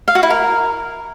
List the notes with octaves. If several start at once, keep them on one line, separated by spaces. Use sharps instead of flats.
F5
F#4
E4
A#4